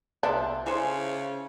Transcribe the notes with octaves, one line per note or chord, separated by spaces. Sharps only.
C2 F3 B3 D4 A4 E5 C6
C#3 E4 A4 C5 G#5